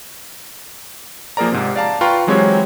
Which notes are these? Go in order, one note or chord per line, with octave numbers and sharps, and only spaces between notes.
F3 A#3 G#4 A#4 D5 A#5
G#2 C3
D5 F5 A5 A#5
F4 B4 G5 A#5 C6 C#6
E3 F#3 G#3 C4 G4 C#5